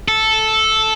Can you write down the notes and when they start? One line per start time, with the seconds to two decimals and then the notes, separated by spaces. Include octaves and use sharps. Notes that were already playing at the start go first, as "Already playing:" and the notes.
0.08 A4